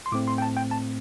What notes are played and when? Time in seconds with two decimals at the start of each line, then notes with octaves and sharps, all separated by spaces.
0.06 C6
0.12 A2 A3 C4 D6
0.28 C6
0.38 G5
0.42 A5
0.57 G5
0.71 A5